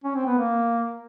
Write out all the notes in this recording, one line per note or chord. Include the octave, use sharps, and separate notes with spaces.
C#4
C4
B3
A#3